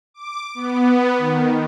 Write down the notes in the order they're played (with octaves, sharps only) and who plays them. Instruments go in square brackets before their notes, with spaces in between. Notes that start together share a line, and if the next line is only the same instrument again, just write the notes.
[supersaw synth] D6
B3
D#3